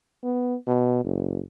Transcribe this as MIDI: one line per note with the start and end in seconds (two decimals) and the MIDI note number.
0.24 0.55 59
0.67 1.04 47
1.04 1.42 30